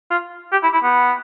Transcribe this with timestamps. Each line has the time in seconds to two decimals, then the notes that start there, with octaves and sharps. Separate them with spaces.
0.10 F4
0.52 G4
0.63 E4
0.73 E4
0.84 B3